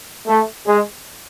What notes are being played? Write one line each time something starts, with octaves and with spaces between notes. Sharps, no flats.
A3
G#3